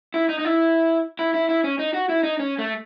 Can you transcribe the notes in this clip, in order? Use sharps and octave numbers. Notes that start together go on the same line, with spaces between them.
E4
D#4
D#4
E4
E4
E4
E4
C#4
D#4
F#4
E4
D#4
C#4
A3